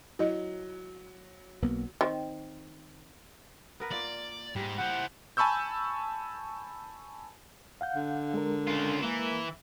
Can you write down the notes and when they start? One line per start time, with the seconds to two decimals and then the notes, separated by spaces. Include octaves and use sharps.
0.19 F#3 E4 D#5
1.62 B1 A#3 B3
2.01 D#3 C4
3.80 B3 A#4 B4
3.92 A#3 F4 D5
4.56 G#2 G3
4.78 E4 C5 F#5
5.37 G#5 A5 B5 C#6 E6 G6
7.81 F5 F#5 G6
7.95 D3
8.34 G#3 A#4
8.67 C#3 F4
9.02 E3 A#3 E4